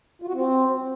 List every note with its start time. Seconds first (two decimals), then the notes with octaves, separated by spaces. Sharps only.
0.22 F4
0.28 F#4
0.34 C4